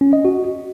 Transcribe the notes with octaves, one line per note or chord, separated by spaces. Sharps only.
C#4
D#5
F#4